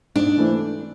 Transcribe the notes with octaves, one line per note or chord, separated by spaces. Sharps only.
G#2 D4
E3 A3 C4